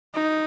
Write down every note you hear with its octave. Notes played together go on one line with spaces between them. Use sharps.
D#4